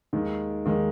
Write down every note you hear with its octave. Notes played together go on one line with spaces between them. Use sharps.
D#2 D#3 G#3
D#2 D#3 G#3